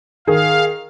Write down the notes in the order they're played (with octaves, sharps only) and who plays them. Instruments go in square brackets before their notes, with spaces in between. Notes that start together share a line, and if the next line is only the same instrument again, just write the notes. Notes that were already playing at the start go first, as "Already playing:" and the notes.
[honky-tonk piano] D#3 G#4 [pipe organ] F5